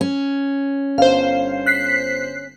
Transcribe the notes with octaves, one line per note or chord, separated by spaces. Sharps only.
C#4
G1 C5 F5
F#6 B6 C7